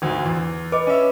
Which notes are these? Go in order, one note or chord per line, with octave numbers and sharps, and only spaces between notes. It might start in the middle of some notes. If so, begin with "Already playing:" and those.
G#1 D2
E2
B4 D#5 D6
C#4 E5